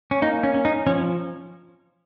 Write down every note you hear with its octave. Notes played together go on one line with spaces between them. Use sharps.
C#4
A#3 D#4
C#4
C#4
D#4
F3 C#4